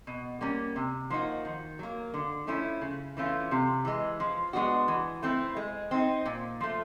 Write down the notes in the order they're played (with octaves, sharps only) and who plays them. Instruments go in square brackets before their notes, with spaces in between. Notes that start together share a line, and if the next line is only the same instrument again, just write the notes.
[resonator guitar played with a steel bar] B2
G3 A#3 C#4
C3
F3 A#3 D#4 F#4
D#3
F#3 A#3
D3
F3 A3 C#4 E4
C#3
E3 A3 C#4 F4
C3
E3 G#3
F3
G#3 B3 D4 F#4
E3
A3 C4 E4
G#3
C4 D#4
A#2
F3 A3